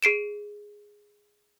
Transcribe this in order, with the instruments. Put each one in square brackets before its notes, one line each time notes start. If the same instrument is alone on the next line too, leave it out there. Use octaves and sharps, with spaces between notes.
[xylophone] G#4 C7 D7 E7